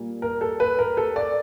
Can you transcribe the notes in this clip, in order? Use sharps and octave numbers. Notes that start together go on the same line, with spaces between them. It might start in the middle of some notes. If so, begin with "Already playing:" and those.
Already playing: A#2 G3 A#3
A#4
A4
B4
A#4
A4
D5